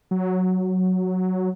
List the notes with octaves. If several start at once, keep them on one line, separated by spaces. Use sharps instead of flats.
F#3